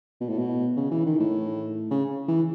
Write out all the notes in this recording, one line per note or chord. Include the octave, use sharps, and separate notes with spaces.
B2
A2
B2
C#3
E3
D#3
A2
C#3
E3